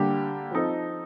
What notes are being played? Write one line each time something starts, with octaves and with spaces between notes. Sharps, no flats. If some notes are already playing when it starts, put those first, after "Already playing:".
Already playing: D3 G3 A#3 D4 G4
F3 C4 D#4 A4